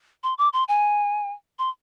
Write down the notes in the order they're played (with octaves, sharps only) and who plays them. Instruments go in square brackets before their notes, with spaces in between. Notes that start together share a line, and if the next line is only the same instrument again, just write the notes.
[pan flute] C6
D6
C6
G#5
C6